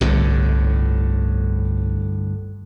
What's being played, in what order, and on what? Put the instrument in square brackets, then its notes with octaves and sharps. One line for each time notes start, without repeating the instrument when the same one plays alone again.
[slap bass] G1 A2 D3 [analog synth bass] C2